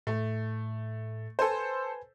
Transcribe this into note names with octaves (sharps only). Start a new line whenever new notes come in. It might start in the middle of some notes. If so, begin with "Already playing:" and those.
A2 A3
A4 B4 C5 G#5